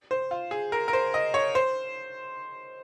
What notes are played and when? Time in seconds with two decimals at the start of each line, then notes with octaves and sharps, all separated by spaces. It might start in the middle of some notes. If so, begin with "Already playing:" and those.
0.11 C5
0.31 F4
0.51 G#4
0.72 A#4
0.88 A#4
0.93 C5
1.14 D#5
1.34 C#5
1.55 C5